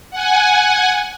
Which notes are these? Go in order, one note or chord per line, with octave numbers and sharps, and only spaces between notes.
F#5 G#5